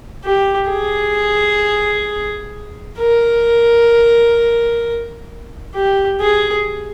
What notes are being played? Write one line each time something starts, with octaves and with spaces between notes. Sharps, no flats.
G4
G#4
A#4
G4
G#4